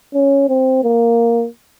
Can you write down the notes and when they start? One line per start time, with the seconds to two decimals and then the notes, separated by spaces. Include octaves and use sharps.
0.14 C#4
0.49 C4
0.83 A#3